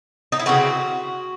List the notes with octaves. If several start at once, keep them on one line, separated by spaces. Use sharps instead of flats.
D#4
E4
C#3 E3 C4 F#4